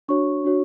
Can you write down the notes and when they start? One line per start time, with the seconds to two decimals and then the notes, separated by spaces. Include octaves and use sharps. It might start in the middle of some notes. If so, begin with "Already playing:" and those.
0.08 D4 F#4 C#5 C#6
0.44 D4 F#4 C#5